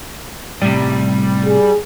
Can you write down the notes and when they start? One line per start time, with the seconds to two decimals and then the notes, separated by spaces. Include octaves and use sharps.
0.62 A2 C3 G3
1.44 G#4